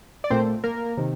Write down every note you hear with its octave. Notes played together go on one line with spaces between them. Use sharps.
D5
A#2 A3 C4 C5
A#3 A#4
C3 D#3